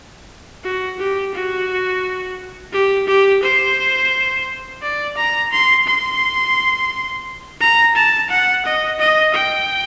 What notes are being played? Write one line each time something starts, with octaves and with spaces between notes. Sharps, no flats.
F#4
G4
F#4
G4
G4
C5
D5
A#5
C6
C6
A#5
A5
F#5
D#5
D#5
G5